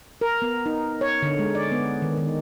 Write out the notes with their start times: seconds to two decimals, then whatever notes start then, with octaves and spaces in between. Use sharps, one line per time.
0.21 A#4
0.42 B3
0.66 D#4
1.01 C#5
1.22 D3
1.39 G#3
1.55 D5
1.72 B3
2.02 D#3
2.17 D#3